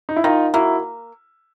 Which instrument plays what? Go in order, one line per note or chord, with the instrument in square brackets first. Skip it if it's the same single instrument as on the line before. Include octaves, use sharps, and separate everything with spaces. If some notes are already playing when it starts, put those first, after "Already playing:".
[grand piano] D#4
E4
[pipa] D#3 [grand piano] D#4 F4
[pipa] A#3 [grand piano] E4 F#4